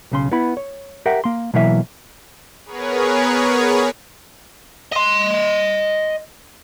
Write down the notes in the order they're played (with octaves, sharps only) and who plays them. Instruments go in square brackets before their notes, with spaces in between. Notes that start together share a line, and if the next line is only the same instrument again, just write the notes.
[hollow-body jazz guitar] B1 C#3 C6
B3 E4 B5
C#5
G4 A#4 E5 F#5 G5
A#3 C6
B2 E3 F#3 A#3 E4 E5
[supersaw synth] B3 G#4 A#4 B4 C#5
[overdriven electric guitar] D#5 C6